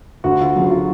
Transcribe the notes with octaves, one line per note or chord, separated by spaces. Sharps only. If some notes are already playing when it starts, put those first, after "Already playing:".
D2 F#4
F4
C#3 F#3
F#4
F4